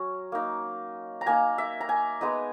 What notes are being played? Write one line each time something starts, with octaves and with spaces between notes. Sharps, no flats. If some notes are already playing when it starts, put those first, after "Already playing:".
Already playing: F#3 C#4 A#5
A#3 D#4
A#5
A#3 D#4 G#5
E5
A#5
G#5
G#3 B3 D#4 D#5